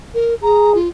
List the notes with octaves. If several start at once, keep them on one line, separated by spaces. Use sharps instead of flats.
A#4
G#4 A#5
F4